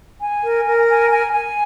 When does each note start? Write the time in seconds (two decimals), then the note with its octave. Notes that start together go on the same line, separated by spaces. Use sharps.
0.21 G#5
0.43 A#4
0.65 A#4
0.88 G#5
1.10 G#5
1.31 G#5